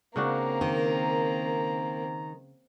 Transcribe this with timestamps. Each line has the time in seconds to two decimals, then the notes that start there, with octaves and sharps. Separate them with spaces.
0.16 C#3 A#3 C4 D4 F#4 A#5
0.61 D#3